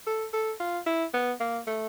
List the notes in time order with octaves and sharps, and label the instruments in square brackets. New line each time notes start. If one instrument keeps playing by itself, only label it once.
[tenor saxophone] A4
A4
F4
E4
B3
A#3
A3